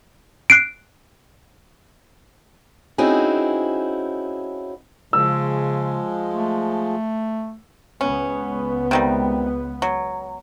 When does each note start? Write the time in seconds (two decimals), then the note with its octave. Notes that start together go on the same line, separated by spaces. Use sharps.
0.50 F#6 C7 D7
2.98 C4 C#4 D#4 E4 F#4 G#4
5.13 C#3 F3 G#3 E6
6.33 A3
8.01 C#2 B3 C#4
8.91 C3 D#3 G3
9.82 F#3